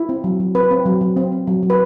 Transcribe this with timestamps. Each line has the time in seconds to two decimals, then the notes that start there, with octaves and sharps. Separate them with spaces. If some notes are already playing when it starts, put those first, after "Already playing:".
Already playing: E4
0.09 C4
0.24 F#3
0.40 F#3
0.55 C4 B4
0.71 C4
0.86 F#3
1.01 F#3
1.17 C4
1.32 C4
1.47 F#3
1.63 F#3
1.70 B4